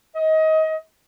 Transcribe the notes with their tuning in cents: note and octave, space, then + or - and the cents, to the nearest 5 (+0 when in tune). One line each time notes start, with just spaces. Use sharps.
D#5 +25